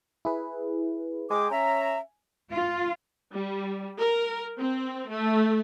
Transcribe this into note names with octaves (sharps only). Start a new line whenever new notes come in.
E4 G#4 B4
G#3 G5 G#5 D6
C#4 E5 A#5
F4
G3
A#4
C4
A3